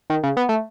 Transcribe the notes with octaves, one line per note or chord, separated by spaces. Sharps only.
D#3
C#3
B3
A3